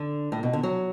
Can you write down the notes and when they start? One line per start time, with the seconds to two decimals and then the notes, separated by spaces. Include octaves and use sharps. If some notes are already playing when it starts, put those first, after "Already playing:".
Already playing: D3
0.32 A2
0.43 B2
0.53 D3
0.63 F#3